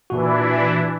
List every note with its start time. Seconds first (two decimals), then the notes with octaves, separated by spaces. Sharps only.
0.10 A#2 E3 D4 E4 F#4